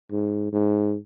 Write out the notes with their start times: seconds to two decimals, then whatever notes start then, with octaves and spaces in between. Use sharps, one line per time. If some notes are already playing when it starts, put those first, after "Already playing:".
0.11 G#2
0.52 G#2